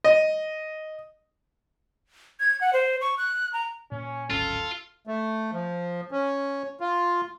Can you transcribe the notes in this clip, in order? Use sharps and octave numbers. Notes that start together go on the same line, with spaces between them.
D#5
G#6
F#5
C5
C#6
F#6
A#5
A#2 C#4
D1 G#1 C#4 F4 A4
A3
F3
C#4
F4